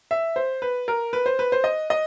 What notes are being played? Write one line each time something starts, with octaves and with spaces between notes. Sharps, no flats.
E5
C5
B4
A#4
B4
C5
B4
C5
D#5
D#5